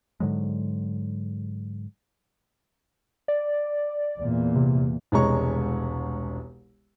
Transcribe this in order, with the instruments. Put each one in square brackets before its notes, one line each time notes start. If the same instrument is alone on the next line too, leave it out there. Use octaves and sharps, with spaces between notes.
[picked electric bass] G#2 D3 F#3 G#3
[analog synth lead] D5
[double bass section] E2 A#2
[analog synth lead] C3
[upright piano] E1 C2 G#3 C#5 A#5 C#6